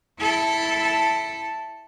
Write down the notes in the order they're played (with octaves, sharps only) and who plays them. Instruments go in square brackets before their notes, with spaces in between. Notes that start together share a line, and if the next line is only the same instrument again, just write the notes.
[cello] E4 A4